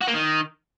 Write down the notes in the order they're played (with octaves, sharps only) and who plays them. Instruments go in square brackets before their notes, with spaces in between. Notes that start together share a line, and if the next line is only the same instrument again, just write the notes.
[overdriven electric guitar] F#4
A#3
D#3